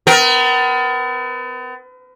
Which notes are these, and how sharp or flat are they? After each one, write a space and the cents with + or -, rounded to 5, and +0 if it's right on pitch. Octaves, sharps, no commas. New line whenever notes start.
B3 +40 A#4 +25